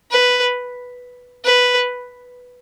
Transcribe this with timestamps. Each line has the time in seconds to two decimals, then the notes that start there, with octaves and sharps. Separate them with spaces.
0.11 B4
1.45 B4